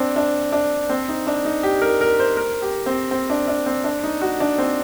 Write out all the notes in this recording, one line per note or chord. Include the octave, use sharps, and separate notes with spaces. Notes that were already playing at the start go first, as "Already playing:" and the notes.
Already playing: C4 D4
D4
D4
C4
D#4
D4
D#4
G4
A#4
A#4
C5
A#4
G4
C4
C4
D4
D4
C4
D4
D#4
F#4
D4
C4